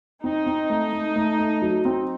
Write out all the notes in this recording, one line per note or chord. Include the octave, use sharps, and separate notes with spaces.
C4 D#4
C4
A3
A3
A3
A3
F#3
C4